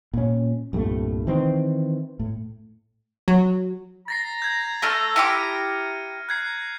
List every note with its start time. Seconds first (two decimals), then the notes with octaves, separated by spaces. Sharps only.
0.14 A#2 C#4
0.73 C2 G2 A#2 A3
1.27 D#3 E3 C4
2.19 A2
3.28 F#3
4.08 A#5 A6 A#6 C7
4.42 G6 G#6
4.82 A3 A4 F6
5.16 E4 G4 D6 F6 C#7 D#7
6.29 A#5 F#6 G#6 C7